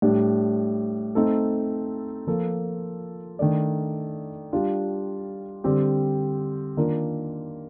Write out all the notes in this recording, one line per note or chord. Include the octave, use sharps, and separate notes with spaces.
A2 G3 D4 G4
A3 C4 D#4 A4
F3 A#3 F4 A4
D#3 A3 D4 A4 D5
G3 D4 F4
D3 G3 C4 G4
D#3 A#3 D4 F4 A#4